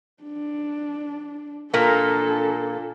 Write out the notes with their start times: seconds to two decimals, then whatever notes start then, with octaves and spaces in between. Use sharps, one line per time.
0.23 D4
1.74 A#2 A#3 D4 A4